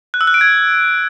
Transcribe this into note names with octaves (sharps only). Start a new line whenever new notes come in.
F#6
E6
F#6
D7
G#6